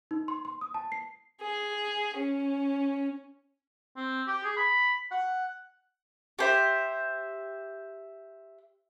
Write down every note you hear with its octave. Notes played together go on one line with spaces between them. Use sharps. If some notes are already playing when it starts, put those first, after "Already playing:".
D#4
C6
C6
D#6
A5
C7
G#4
C#4
C4
G4
G#4
B5
F#5
G4 C5 E5